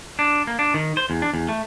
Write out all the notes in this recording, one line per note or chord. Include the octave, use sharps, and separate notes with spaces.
D4
A#3
D4
D#3
C5
E2
D4
E2
A3